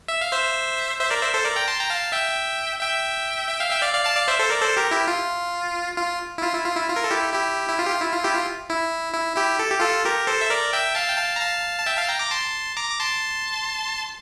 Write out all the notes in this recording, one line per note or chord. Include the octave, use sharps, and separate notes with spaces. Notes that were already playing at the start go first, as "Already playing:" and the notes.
E5
F5
C5 E5
C5 E5
A#4 D5
C5 E5
A4 C5
A#4 D5
G5 A#5
A5 C6
G5 A#5
F5 A5
E5 G5
E5 G5
E5
F5
E5 G5
D5 F5
D5 F5
F5 A5
D5 F5
C5 E5
A4 C5
A#4 D5
A4 C5
G4 A#4
E4 G4
F4
F4
E4
F4
E4
F4
E4
F4
A#4
A4
E4 G4
E4 G4
E4
F4
G4
F4
E4
F4
E4 G4
F4
E4
E4
E4 G4
A4
G4
F4 A4
G4 A#4
A4 C5
E5
A#4 D5
E5 G5
F5 A5
G5
F5 A5
A#5
F5 A5
A5
E5 G5
F5 A5
G5 A#5
A#5 D6
A5 C6
A#5 D6
D6
A5 C6